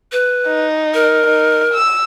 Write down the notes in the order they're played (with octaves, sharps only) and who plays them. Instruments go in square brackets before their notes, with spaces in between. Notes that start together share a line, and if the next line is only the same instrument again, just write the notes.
[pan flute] B4
[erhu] D#4
[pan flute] A#4
[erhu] D#4
E6